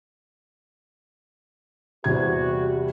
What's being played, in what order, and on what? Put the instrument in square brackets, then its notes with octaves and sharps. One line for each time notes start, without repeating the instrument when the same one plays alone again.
[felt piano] E2 C3 G#6 [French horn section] G3 F#4 G4